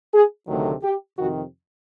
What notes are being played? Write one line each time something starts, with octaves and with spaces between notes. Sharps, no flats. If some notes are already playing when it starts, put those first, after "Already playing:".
G#4
D2 C3 D#3 F#3 A3
G4
F2 C3 D#3 F#4